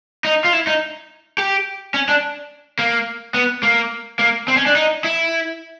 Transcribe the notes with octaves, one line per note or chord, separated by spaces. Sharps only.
D#4
F4
E4
D#4
G4
C#4
D4
A#3
B3
A#3
A#3
C4
C#4
D4
D#4
E4